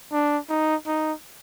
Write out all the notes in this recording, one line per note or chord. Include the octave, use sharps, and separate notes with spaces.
D4
D#4
D#4